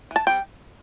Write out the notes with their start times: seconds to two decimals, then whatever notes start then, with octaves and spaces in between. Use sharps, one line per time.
0.11 E3 A5
0.27 G3 C4 G5